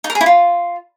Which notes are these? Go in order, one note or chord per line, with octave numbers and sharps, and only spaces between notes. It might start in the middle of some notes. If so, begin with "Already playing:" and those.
D#4
A#4
G#4
E4
F4